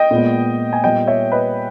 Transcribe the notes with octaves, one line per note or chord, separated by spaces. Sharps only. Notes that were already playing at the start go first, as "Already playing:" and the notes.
Already playing: D#5 G5
A#2 G#3 B3
G#5
A#2 G3 B3 D#5 G5
C#5 E5
B4 D#5